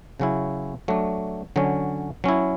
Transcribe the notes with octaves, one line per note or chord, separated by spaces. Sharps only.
C#3 F#3 C#4 E4
F#3 A3 D4
D3 F#3 C#4
F#3 C#4 E4